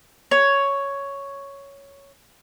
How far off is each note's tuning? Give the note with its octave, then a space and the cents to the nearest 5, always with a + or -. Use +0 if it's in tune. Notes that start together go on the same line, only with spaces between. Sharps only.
C#5 +5